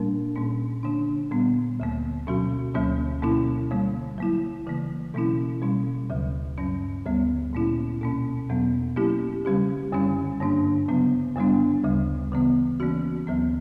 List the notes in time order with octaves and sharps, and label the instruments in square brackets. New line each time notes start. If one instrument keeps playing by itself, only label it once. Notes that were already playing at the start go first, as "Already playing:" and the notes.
Already playing: [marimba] A#2 G3 A#3 D4 A#4
A#2 A#3 C#4
D3 A#3 D4
A#2 G3 B3
D2 D3 A#3
B2 F#3 C#4 F#4
D2 D3 F#3 A#3 C#4
B2 A#3 C#4 E4
D3 G3 A#3
F#3 A#3 E4
C#3 E3 A#3
B2 F#3 A#3 C#4 E4
B2 G3 C#4
D2 C#3 F#3
G2 F#3 C#4
D2 D3 G3 B3
A#2 A#3 C#4 E4
B2 A#3 C#4
E2 B2 F#3 B3
F#3 A#3 C#4 E4 G4
C#3 G3 C#4 G4
F#2 D3 G3 C#4
G2 D3 A#3 D4
C#3 F#3 B3
F#2 D3 G3 B3 D4
D2 C#3 G3
C#3 E3 B3
E3 A#3 C#4 F#4
D2 D3 F#3 B3